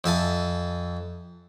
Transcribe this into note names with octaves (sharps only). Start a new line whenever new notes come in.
F2 E5 G#5 A5